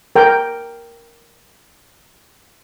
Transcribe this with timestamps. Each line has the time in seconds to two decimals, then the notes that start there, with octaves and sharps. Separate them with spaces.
0.16 A#4 G5